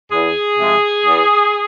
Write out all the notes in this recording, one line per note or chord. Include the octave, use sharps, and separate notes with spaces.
E2 G#4
C3 F3 G#3
E2